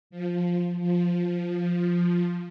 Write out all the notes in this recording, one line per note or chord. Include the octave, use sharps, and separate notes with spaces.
F3
F3